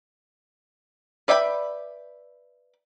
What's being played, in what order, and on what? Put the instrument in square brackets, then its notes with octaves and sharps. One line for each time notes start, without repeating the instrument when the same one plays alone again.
[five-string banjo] B4 D5 E5 G5 B5